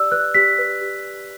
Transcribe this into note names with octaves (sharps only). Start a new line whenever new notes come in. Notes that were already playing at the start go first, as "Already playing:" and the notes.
Already playing: G4 D5 E6
B4 F#6
G4 B6
B4
G4